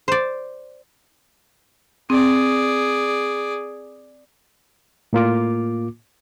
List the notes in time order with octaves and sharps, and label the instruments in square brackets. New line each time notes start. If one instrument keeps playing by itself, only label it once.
[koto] C5 D5
[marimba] C4 [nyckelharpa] G#4 D5
[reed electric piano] A2 A#3 F4 D6